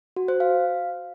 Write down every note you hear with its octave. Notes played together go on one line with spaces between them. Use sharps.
F#4
C5
F5